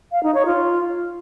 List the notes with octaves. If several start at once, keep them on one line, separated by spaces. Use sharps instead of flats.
F5
D#4
C#5
F4